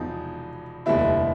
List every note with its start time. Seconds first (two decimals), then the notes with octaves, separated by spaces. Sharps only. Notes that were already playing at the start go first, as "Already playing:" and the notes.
Already playing: E1 E2 C3 F3 D#4
0.86 F1 D#2 D3 G3 B3 E4 E5